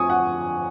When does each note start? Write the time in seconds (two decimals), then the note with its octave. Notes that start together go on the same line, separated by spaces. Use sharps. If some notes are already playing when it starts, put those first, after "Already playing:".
Already playing: F2 F3 G#5 C#6 D#6
0.09 F#5